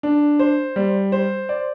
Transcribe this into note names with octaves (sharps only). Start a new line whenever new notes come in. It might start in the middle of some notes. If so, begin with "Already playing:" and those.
D4
C5
G3
C5
D5